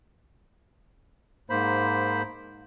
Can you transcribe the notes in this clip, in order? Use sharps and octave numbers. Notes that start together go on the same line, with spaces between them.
G#2 A#3 C5 B5